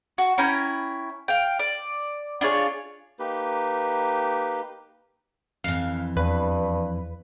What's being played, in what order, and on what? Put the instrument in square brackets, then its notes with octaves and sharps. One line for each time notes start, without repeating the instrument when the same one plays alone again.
[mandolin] F#4
C#4 E4 G5 A#5
F5 G5
D5
D4 F4 G#4 C#5
[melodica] A#3 D#4 G4 B4
[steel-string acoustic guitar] F2 E3 [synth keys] F5
[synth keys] E2 B4 [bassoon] G2